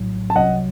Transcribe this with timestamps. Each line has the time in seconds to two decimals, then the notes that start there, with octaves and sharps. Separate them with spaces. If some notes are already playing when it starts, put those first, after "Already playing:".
Already playing: A#1 A2 F#3
0.30 A5
0.36 C2 C3 F#3 D#5 F#5